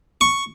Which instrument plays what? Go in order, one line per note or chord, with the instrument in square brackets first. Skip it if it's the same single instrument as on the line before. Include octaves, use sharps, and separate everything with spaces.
[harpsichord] C#6